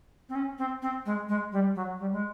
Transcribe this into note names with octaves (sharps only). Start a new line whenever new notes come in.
C4
C#4
C4
C4
G#3
G#3
G3
F#3
G3
G#3